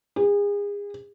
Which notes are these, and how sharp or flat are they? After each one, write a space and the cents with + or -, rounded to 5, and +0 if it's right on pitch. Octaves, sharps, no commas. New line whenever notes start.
G#4 -35